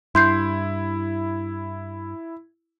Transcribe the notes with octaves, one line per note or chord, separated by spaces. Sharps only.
G2 E4 C6 G6 C7